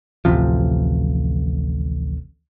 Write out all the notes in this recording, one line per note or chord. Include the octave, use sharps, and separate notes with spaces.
A1 D2 C3 F3